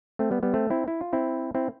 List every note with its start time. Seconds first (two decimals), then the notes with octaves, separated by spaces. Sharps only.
0.19 A3 C4
0.31 G3 B3
0.43 G3 B3
0.54 A3 C4
0.70 C4 E4
0.88 E4
1.01 F4
1.13 C4 E4
1.55 C4 E4